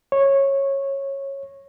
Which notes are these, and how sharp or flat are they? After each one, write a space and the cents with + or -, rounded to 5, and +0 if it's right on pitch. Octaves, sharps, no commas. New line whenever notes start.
C#5 -15